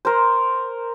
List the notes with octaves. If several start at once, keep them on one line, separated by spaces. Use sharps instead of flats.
A#4 C5